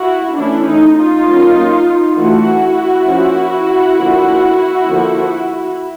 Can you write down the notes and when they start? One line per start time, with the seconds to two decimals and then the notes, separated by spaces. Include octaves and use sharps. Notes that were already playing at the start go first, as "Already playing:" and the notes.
Already playing: E4 F#4
0.37 E3 A3 C#4 D4 E4
0.67 D#4
0.96 D#4 F4
1.27 F#3 A#3 C#4
2.16 E3 A3 D4 E4 F#4
3.06 F3 A#3 C#4
3.96 D3 F3 A#3 D4
4.85 D3 F3 A#3